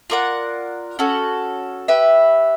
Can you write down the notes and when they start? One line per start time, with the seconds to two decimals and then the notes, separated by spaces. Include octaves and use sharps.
0.10 F4 A#4 D5 F#5
0.99 C#4 F#4 A4
1.88 G4 B4 E5